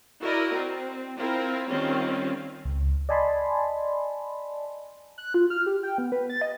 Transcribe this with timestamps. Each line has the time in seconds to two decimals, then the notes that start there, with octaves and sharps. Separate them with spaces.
0.20 E4 F#4 A#4 D5 D#5
0.54 C4
1.17 C4 E4 F4 A#4
1.67 D#3 G3 C4 C#4 F4
2.65 C#2
3.09 D5 D#5 G#5 A5 B5 C6
5.18 F#6
5.34 F4
5.50 F6
5.66 G4
5.83 G5
5.98 B3
6.12 B4
6.30 A6
6.41 D#5